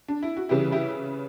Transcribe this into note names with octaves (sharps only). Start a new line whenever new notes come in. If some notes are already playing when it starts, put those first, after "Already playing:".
D4
E4
F#4
C#3 E3 G3 E4 G4
E4 G4